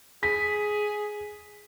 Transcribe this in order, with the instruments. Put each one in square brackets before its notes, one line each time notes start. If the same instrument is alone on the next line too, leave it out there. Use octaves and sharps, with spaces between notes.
[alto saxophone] G#4 [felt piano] B6